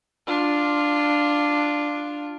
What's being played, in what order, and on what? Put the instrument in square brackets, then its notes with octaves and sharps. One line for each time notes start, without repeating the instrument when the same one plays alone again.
[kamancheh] D4 F4